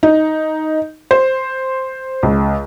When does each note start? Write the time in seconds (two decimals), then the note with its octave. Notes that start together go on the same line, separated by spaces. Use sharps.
0.03 D#4
1.11 C5
2.23 C#2